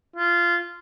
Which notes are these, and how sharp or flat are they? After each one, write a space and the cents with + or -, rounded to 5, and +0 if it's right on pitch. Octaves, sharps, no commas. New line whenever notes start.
F4 -15